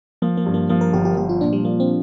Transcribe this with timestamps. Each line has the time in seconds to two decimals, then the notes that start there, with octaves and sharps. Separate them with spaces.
0.22 F3 A#3
0.37 A#3
0.46 G2
0.54 A#3
0.69 F3 A#3
0.81 A#4
0.93 G1 G4
1.05 G4
1.17 F3 G4
1.29 F4
1.40 A#2 D4
1.53 G3
1.65 F3 A#3
1.80 C4